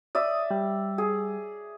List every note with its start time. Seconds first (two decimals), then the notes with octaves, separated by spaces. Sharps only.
0.15 D5 E5 D#6
0.51 G3
0.98 G#4